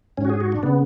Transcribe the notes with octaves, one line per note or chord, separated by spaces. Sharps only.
G#2 C#4
F#4
G#4
F#4
D4
C#3 B3